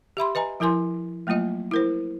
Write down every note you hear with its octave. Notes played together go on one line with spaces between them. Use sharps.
G4 E5 B5 C6
B4 D#5 G#5 A#5
F3 E4 A#4 G#5 C6
F#3 A3 A#3 F4 D#5
E4 A#4 C5